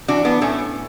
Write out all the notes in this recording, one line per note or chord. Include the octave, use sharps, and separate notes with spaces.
E3 D4 F#4
B3 D4
A2 A3 C#4